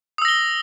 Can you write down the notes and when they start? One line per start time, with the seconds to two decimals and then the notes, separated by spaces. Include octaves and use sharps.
0.18 D#6
0.22 E6
0.25 A#6
0.28 G7